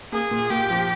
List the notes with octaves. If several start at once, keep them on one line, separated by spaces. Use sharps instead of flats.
A#3 G#4
A#2
A#2 G4
F3